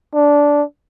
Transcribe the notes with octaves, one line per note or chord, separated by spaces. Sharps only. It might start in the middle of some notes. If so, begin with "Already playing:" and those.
D4